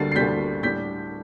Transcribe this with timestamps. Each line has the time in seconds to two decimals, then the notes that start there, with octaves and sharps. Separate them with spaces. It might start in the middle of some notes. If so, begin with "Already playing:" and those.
Already playing: D2 D3 G3 A6 C7
0.12 C7
0.16 D2 D3 G3 G6 B6
0.63 A2 G3 D4 G6 B6